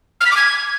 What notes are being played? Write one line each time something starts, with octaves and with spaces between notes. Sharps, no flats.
F6
B6
D6
G#6